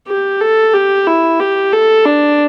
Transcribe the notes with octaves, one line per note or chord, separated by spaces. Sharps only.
G4
A4
G4
E4
G4
A4
D4